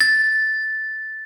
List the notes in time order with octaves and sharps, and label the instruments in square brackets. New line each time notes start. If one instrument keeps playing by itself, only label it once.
[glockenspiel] A6